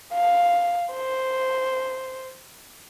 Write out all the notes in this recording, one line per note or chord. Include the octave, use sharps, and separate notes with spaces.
F5
C5